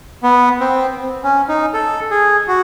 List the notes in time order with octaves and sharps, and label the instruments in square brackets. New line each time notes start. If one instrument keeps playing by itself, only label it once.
[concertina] B3
C4
C#4
D#4
A4
G#4
F#4